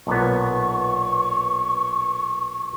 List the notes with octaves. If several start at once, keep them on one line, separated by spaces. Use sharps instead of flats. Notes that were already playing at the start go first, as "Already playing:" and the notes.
B1 A#2 B3 C#6